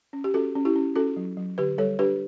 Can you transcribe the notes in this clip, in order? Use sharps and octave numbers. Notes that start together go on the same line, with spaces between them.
C#4
G4
C#4 F#4 A4
C#4
E4 G4
C#4
C#4 F#4 A4
F#3
F#3
D3 G4 B4
G3 A4 C#5
D4 G4 B4